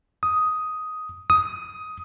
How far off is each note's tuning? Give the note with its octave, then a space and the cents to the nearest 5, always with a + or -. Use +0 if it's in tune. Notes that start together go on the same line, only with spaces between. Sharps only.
D#6 +5
D#6 +10